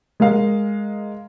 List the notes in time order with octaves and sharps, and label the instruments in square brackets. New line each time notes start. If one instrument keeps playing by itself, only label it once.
[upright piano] G#3 A#4 D#5 F5